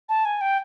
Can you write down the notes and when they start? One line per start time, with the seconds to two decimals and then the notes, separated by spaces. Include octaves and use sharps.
0.09 A5
0.25 G#5
0.41 G5